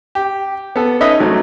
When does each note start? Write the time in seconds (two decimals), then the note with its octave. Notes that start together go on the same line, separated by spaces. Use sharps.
0.15 G4
0.76 B3 A4
1.01 C#4 D#4 B4 D#5 E5
1.20 C2 F#3 A3